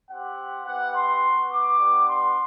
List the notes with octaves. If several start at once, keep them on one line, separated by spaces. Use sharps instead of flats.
C4 G4 F#5
B3 E4 G4 F#5
C6
B3 F#4
D6
B3 D4 G4
C6